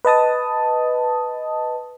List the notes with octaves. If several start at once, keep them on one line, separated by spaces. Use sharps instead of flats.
B4 D#5 A5 D#6